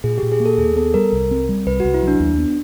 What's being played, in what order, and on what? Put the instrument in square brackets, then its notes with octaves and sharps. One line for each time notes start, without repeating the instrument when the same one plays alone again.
[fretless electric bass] A#2 [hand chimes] G#4
[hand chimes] G4
[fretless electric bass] A#2
[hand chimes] G#4
[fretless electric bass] A#3
[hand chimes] A4
[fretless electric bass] D#2 [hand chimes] G#4
[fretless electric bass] B3 [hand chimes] A4
[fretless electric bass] G3 [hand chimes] A#4
[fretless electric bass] C2
C4
G3
[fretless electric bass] C2 [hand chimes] B4
[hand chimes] F#4
[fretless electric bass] C2
[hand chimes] E4
[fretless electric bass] F#3 [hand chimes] D4
[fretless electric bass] D#2
B3